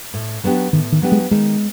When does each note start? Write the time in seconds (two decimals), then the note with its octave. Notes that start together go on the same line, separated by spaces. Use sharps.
0.14 A2
0.44 F#3 B3 D4 G4
0.73 A2 D#3
0.92 D#3
1.02 F#3 B3 D4 G4
1.12 G#3
1.31 D#3 G#3